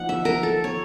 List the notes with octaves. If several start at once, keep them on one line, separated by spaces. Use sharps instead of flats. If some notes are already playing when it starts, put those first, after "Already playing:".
Already playing: F3 A#3 D#4 F#5
E5
A#4
A4
C#5